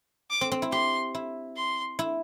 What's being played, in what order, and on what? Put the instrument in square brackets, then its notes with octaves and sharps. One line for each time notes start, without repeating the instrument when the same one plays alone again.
[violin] D6
[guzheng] C4
C4
E4
[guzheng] G4 [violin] C6
[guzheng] E4
[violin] C6
[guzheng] E4